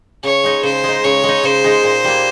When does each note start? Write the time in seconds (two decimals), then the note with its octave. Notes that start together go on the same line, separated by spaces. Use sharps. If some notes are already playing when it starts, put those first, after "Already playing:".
0.24 C#3 C#5
0.44 G#3 D#4
0.63 C#3 C5
0.84 G#3 D#4
1.04 C#3 C#5
1.24 G#3
1.29 D#4
1.44 C#3 C5
1.64 G#3 D#4
1.84 A#2
2.04 G3 A#3